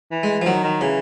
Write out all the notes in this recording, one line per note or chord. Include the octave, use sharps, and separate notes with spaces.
E3
G#3
F3
D#3 F#3
D#3
C#3 E3